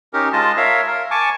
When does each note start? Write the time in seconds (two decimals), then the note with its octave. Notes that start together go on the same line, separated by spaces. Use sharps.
0.14 C#4 D#4 G4 A#4
0.33 G#3 F4 D#5 A5
0.57 A#4 C#5 E5 F5
0.87 A#4
1.11 G#5 A5 C#6 D6